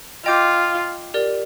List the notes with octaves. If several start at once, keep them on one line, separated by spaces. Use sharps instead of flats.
F4 D#5 G5 D6 G6
G4 A#4 D5